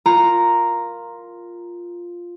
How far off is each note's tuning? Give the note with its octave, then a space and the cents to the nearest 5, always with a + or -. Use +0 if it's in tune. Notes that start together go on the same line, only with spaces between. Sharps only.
F4 +0 A#4 +0 A#5 +0